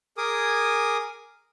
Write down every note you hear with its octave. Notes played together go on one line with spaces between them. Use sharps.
G#4 A#4 G#5 D6 D#6